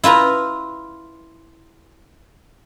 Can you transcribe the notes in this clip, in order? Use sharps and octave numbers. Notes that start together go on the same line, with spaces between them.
E4 F4 B4 A#5